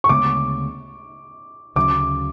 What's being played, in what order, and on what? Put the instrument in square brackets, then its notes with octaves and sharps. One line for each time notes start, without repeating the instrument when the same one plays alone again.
[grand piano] C#6
[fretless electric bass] D2 C#3 G#3 B3 [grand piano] D6
[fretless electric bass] D2 C#3 F#3 [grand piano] D6